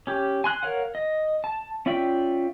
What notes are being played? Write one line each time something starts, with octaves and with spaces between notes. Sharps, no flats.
C#4 G4
G#5 C6 F#6
A#4 C#5 F5 F#5
D#5
A5
C#4 F4 D5 E5 G5